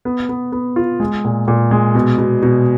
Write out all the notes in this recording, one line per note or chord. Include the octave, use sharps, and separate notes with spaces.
B3
B3
B3
F4
G#3
A#2
A#2
G#3
B2
B2
B2